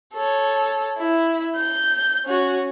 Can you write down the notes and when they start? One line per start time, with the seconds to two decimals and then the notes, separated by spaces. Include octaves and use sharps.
0.14 A4 C#5
0.98 E4
1.56 G6
2.25 C#4 F#4